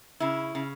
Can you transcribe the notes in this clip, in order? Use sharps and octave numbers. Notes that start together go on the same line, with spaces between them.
C#3 E4
C#3